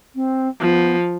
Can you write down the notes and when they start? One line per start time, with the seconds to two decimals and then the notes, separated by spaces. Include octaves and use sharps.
0.14 C4
0.60 F3 B3